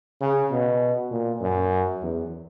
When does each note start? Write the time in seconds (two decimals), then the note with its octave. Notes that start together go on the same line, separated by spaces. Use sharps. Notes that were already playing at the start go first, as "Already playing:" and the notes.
0.21 C#3
0.51 B2
1.11 A#2
1.41 F#2
2.02 E2